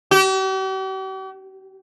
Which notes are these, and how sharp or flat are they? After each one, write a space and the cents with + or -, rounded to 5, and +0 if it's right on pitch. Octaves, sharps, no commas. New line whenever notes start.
G4 -45